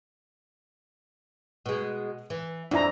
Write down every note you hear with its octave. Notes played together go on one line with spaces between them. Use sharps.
B2 G#3
E3
F2 D4 E4 A#5